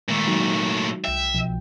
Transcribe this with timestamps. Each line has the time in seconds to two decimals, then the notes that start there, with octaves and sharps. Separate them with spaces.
0.08 A#2 D#3 G#3 A3
0.27 F#3 D#4 F#4
1.04 C2 E5 G5
1.34 B1 B2 F3